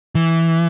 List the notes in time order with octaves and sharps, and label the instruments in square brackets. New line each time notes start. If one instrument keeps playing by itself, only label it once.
[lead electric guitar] E3